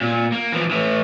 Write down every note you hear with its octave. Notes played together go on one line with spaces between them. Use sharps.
A#2
A#3
E3 F3
A2 E3